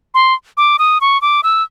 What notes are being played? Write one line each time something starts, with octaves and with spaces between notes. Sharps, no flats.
C6
D6
D#6
C#6
D6
E6